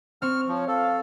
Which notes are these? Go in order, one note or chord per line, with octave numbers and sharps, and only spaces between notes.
C4 C#6 F6
F3 C#5
A4 F5